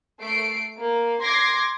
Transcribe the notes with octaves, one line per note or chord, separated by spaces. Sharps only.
A3 C7 D7
A#3
C6 D6 G#6 A#6 C7